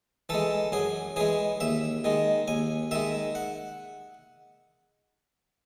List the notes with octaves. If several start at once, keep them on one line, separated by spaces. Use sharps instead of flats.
E3 G#3 A4
F#2 G#4
E3 G#3 G#4
D#2 E5
D#3 G#3
D#2 G#5
D#3 G#3 E5
F#5